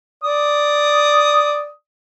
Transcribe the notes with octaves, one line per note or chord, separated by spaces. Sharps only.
D5 D#6